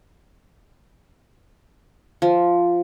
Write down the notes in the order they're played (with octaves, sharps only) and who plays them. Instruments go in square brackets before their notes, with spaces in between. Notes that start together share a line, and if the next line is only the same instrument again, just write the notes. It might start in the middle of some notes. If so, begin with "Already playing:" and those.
[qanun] F3